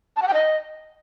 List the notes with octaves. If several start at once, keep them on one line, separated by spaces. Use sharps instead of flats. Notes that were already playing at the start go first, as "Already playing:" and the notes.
A5
F#5
G5
D#5